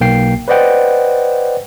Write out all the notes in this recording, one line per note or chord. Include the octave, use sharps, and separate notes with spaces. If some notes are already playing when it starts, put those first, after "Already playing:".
B1 A#3 G5 C7
B4 C5 D5 D#5 F#5 G5